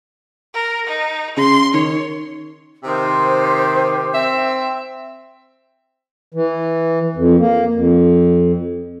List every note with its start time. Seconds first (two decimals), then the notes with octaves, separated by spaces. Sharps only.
0.54 A#4
0.87 D#4
1.37 C#3 C6
1.74 D#3 C#5
2.84 C3 D#3 G4 C5
4.14 C4 E5
6.34 E3
7.16 F2
7.39 A#3
7.74 F2